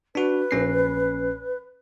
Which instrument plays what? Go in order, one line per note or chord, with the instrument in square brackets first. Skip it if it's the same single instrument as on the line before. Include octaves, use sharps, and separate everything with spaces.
[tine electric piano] D4 F#4 [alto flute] B4
[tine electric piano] A#1 C#4 C7